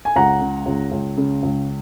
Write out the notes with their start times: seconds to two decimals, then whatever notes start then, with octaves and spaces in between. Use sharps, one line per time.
0.05 G#5
0.16 C#2 F#5 A#5
0.41 C#3
0.66 C#2
0.92 C#2
1.17 C#3
1.43 C#2